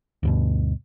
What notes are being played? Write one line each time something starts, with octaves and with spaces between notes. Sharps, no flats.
D2 G2 B2